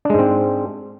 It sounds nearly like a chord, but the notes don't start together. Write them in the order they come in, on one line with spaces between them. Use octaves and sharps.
D4 G#3 G#2 C4